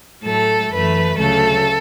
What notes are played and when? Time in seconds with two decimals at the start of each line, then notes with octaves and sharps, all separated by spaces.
0.24 A2 F#3 A3 A4
0.71 F#2 E3 A3 B4
1.18 D2 C#3 F#3 A3 A4